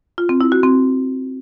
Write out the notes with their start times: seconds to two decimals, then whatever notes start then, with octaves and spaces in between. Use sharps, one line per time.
0.18 F4
0.29 C4
0.41 E4
0.52 F#4
0.63 C4